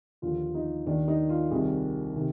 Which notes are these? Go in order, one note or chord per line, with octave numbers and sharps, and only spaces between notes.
D#2 D3 F3 F4
D#4
D#2 D#3 D4
D#4
F4
C2 C3 D#3 G#4
C3 D#3